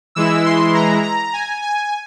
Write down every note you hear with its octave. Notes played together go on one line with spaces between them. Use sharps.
E3 G#3 E4 E6
C6
A#5
A#5
G#5
G#5